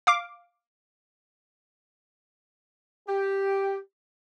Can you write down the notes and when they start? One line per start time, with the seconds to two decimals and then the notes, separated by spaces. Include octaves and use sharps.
0.07 F5 D6
3.08 G4